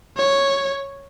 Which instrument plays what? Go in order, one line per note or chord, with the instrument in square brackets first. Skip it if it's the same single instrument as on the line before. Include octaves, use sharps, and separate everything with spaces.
[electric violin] C#5